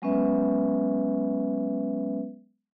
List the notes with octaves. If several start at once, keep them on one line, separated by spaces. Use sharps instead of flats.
F#3 G#3 B3 C#4 B4 E5